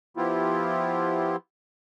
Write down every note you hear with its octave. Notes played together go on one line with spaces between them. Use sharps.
F3 B3 E4 F4 G4